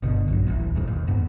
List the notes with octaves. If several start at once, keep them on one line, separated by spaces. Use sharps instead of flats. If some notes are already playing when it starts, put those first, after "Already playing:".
G1 B2 D3
A#1 G2 F3 F#3
D1 A1 E3
E1 A#1 F2
D#2
F2 G#2 B3